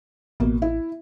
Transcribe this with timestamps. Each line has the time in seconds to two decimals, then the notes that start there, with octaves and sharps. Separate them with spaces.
0.40 A1 B2 A#3
0.62 E4